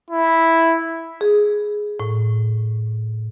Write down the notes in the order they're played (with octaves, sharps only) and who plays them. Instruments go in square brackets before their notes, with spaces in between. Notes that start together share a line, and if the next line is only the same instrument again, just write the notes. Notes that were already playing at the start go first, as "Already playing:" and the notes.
[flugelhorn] E4
[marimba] G#4
A2